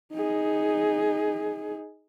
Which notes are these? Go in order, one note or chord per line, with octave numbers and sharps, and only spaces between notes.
D#4 G#4